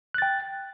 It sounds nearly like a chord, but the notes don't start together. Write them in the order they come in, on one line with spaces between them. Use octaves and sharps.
F#6 A6 G5